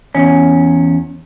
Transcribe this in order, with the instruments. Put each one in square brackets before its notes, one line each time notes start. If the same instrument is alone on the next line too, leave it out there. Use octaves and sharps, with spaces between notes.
[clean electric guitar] E2 C#4